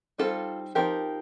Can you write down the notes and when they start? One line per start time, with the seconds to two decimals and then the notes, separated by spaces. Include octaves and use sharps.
0.18 G3 C4 D#4 F4 A4
0.75 F3 C4 D#4 G4 A#4